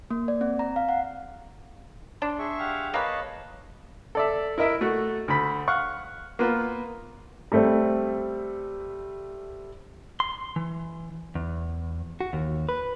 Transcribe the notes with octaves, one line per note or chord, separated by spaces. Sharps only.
A#3
D5
C4
A#5
F5
F#5
D4 C6
G#4 E5 C#6
G4 F5 F#5
A#3 B4 C#5 D#5 A5
A4 D5 E5
E4 A#4 D#5 E5
A3 F#4
D2 A3 B5
F5 F#5 C#6
A#3 B3 F4 B4
G3 A3 C4
C6
E3
E2
F#4
D#2
B4